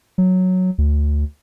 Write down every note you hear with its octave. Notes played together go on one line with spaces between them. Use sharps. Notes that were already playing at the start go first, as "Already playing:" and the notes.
F#3
D2